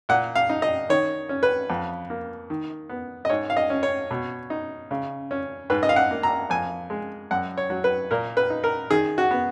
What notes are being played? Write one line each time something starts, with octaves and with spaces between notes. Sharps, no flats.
A#2 F#5
F5
D#4
D#5
D#3 C#5
C#4
B4
F2
A#3
D#3
B3
D#5
G#2 C#5
F5
D#5
C#4
C#5
B2
D#4
C#3
C#4
G#2 B4
D#5
F5
F#5
A#3
A#5
F2 G#5
G#3
F#2 F#5
C#5
F#3
B4
A#2 A#4
B4
D#4
A#4
D#3 G#4
F#4
B3